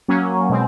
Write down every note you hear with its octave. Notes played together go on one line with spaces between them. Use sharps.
F#3 A#3 C#4
B2 G#3 C4